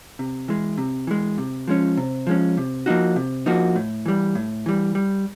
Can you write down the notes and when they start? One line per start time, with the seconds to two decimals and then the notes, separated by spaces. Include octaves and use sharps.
0.19 C3
0.48 E3 G#3
0.78 C3
1.07 E3 G#3
1.38 C3
1.68 F3 G#3 C#4
1.97 C3
2.27 F3 G#3 C#4
2.57 C3
2.86 F3 A#3 D#4 F#4
3.16 C3
3.46 F3 A#3 D#4 F#4
3.76 A2
4.06 E3 G3
4.35 A2
4.66 E3 G3
4.95 G3